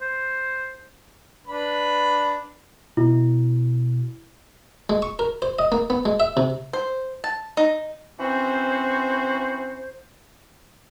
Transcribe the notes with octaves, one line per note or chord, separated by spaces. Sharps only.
C5
D4 B4 B5
B2 E4
G#3
C#6
A#4
C5
D#5
A#3
B3
G#3
E5
C3
C5
A5
D#4
E3 C4 C#4 F#4 C5